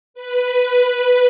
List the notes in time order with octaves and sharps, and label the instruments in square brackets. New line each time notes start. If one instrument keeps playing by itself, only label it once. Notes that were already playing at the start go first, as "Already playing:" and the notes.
[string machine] B4